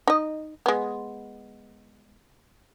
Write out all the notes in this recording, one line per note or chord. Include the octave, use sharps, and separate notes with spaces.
D#4 D#5
G#3 B3